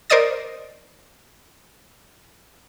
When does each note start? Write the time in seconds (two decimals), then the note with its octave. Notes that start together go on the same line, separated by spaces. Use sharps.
0.10 A#4 C5 D5 D#5 D#6 A6